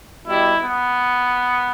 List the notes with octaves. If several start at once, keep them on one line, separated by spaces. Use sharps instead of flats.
B2 G3 E4
B3